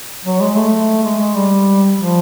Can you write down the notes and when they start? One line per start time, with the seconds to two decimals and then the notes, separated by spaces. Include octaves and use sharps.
0.25 F#3
0.41 G#3
0.56 A3
1.03 G#3
1.19 G#3
1.35 G3
1.97 F3